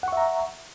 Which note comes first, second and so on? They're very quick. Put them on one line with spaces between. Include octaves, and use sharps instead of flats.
F#5 C#6 E5 A#5